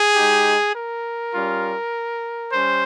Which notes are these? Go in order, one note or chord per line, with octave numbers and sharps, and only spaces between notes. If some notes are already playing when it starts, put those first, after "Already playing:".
Already playing: G#4
G#3 D#4 G4
A#4
G3 C#4 F4
G3 C#4 C5